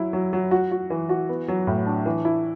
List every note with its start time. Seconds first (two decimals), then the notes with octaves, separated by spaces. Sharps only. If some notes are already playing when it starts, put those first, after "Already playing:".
Already playing: F#3 E4
0.13 F#3
0.33 F#3
0.51 F#4
0.71 F#4
0.90 E3
1.09 F#4
1.29 B3
1.48 F#3
1.67 A2
1.86 D4
2.05 E3
2.25 E4